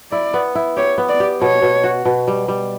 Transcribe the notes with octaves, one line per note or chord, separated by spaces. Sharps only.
E4 D5
B3
E4
G4 C#5
B3
D5
G4
B2 C#5
B2
F#4
B2
G3
G3